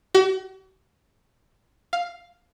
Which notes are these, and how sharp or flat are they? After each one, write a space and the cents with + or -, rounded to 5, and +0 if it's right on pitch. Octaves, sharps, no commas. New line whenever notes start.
F#4 +45
F5 +5